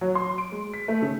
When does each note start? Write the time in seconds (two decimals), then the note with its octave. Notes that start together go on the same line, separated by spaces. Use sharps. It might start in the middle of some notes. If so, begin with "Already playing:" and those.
0.01 F#3
0.15 C6
0.38 D7
0.52 G#3
0.74 B6
0.88 A3
1.02 C#3